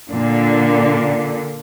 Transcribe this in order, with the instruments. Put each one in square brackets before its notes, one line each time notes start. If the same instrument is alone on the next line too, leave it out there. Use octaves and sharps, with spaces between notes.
[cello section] A#2 D3